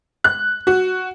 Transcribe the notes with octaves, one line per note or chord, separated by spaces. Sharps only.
F#6
F#4